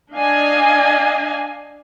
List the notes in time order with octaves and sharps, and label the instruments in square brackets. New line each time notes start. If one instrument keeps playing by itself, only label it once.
[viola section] D4 D#5 F5 G#5